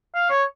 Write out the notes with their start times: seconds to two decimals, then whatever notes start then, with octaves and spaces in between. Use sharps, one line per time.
0.15 F5
0.30 C#5